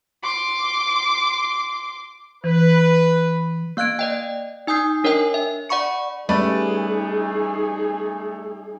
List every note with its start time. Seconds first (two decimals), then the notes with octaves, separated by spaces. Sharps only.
0.23 C6 D6
2.44 E3 B4
3.77 A#3 F5 F#6 G#6 D7
3.99 D5 D#5 G5
4.67 D#4 G#5 D#6 G6 C7
5.04 D4 A#4 C#5 D#5 G5 G#5
5.34 E5
5.69 D5 F#5 B5 C#6 C#7
6.29 G3 A3 C#4 D#4 G#4 B4 D5